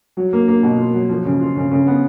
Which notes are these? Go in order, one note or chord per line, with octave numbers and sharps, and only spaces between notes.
F#3
A#3
A#3
B2
F4
F#3
F3
C#3
F4
C#3
C#3
B3